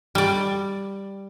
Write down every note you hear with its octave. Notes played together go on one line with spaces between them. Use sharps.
G3 D5